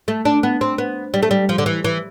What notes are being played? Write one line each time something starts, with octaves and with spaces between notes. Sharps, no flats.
A3
D4
B3
C4
B3
G3
A3
G3
F3
D3
E3
E3